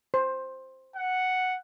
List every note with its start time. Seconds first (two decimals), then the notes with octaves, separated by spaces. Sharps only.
0.14 C5
0.96 F#5